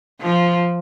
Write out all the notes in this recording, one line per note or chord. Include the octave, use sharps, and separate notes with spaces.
F3